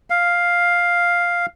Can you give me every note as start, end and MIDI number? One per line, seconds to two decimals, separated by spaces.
0.10 1.46 77